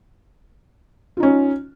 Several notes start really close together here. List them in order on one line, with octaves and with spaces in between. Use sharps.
F4 D#4 C#4